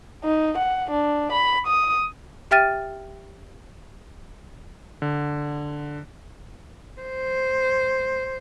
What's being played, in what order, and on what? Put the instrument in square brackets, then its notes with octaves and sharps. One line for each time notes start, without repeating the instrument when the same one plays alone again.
[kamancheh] D#4
F#5
D4
B5
D#6
[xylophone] G4 E5 G5 F6 A6 D#7
[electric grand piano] D3
[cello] C5